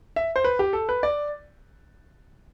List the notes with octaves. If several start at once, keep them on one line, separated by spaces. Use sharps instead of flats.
E5
C5
B4
G4
A4
B4
D5